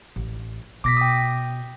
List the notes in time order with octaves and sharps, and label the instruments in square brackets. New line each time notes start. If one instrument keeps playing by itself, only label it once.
[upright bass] A1
[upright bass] B2 [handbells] D6 A#6 B6
[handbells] G5 D#6